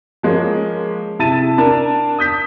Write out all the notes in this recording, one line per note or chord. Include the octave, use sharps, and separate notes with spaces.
F3 G#3 A#3 C#4
C3 E4 A5 A6 D#7
D4 A#4 A5
D#6 G6 B6